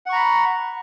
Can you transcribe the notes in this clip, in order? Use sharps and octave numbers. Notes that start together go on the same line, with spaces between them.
F#5 A#5 B5 C#6